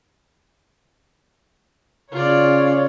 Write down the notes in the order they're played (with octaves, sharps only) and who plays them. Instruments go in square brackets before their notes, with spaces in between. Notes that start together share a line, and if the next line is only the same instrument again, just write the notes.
[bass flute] C#3 [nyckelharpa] F4 D5 [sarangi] C#5